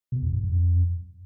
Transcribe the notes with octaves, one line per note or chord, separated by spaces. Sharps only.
B2
E2
F#2
F2